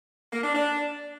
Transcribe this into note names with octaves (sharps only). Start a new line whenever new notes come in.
A#3
D4
D4